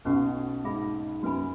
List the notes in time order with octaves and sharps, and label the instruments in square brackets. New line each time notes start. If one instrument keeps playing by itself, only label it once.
[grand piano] B1 B2 [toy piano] C#4 F#4 B4 F#5 C#6
[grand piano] G#2 [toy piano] G#4 E5 B5
[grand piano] F#2 [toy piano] F#4 B4 G#5 B5